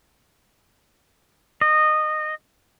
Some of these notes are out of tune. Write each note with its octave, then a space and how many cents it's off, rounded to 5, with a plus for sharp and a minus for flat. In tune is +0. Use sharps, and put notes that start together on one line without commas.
D#5 -15